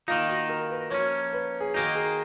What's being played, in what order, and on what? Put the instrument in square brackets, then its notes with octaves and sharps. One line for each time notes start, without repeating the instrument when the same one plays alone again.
[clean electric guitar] D#3 A#3 D#4 [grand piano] F4
[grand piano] F#4
A#4
B4
[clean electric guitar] F3 A#3 C#4 [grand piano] C#5
[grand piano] B4
G#4
[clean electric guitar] D#3 A#3 D#4 [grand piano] F#4
[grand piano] G#4